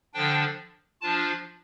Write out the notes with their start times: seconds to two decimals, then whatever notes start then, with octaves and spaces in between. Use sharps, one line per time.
0.14 D3 F3 D4 G5
1.01 F3 D4 F4 A5